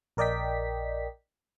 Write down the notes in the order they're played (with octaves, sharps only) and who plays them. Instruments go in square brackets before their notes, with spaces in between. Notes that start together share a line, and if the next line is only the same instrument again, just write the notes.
[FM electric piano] A#1 A#4 D5 D#5 G5 B6